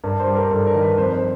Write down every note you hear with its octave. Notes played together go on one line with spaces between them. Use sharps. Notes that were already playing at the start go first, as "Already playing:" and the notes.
G2 A#4
C5
G3
A#4
G2 A4
A#4
D#3
B4
F2 C5
C5